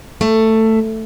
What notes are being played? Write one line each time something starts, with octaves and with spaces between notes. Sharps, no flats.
A3